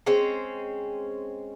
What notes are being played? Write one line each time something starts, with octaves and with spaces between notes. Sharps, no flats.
G#3 C4 C#4